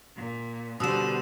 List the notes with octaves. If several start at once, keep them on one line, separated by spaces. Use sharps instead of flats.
A#2
B2 D3 G3 C5 D#6 E6 E7